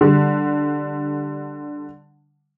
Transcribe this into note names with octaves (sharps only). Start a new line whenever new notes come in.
D3 G3